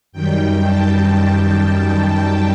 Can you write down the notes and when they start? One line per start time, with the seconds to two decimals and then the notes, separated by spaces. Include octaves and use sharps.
0.12 F#2 D#3 G3 G5
0.63 A5